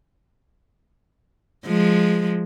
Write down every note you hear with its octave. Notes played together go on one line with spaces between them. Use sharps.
F3 G#3